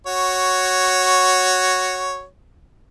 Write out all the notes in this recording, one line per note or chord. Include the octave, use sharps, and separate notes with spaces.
F#4 C#5